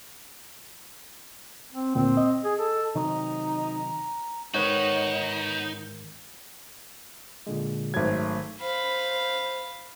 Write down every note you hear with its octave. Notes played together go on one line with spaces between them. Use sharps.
C4
D2 A#2 C4
D#5
G#4
A4
C3 D#3 F#3 D#4 A#5
G#2 D#3 B3 D#4 F#4 B4 C#5 F#5
A#2 D3 G#3
G#1 F#3 A3 G#6
C5 F5 B5